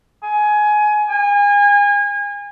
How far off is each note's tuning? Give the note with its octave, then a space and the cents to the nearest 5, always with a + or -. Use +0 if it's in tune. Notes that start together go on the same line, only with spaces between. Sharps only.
G#5 +20
G#5 -30